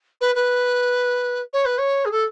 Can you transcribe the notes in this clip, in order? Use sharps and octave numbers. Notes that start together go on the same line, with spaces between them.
B4
B4
C#5
B4
C#5
G#4
A4